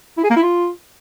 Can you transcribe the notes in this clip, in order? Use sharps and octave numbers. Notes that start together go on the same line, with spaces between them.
E4
G#4
A#3
E4
F4